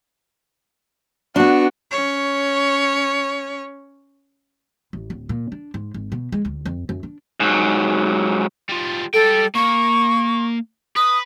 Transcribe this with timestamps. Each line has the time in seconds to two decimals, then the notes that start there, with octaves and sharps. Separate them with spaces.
1.36 B3 D4 F#4
1.91 C#4 C#5
4.93 A1
5.10 D1
5.29 A#2
5.52 D4
5.74 G#2
5.94 G#1
6.12 B2
6.32 G#3
6.45 D2
6.65 F2
6.89 F#2
7.03 D4
7.40 G#2 F#3
8.69 G3 F4
9.14 G3 A4 G5
9.55 A#3 C#6
10.96 B4 D#6